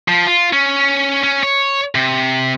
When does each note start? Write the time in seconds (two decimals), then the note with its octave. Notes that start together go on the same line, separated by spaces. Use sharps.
0.08 F3
0.27 F4
0.53 C#4
1.23 C#4
1.43 C#5
1.95 C3